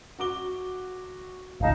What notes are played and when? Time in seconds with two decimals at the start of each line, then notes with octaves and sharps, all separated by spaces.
0.19 F#4 D6 G7
1.60 G#1 C#2 D#4 F5 A5